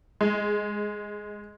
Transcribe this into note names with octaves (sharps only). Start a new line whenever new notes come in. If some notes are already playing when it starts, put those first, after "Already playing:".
G#3